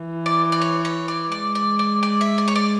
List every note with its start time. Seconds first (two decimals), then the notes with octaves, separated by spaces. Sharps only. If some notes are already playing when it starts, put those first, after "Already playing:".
Already playing: E3
0.26 D5
0.52 D5
0.62 C#5
0.85 C#5
1.08 D5
1.32 G#3 D5
1.55 D5
1.79 D5
2.03 D5
2.21 E5
2.38 D5
2.48 C#5
2.56 D5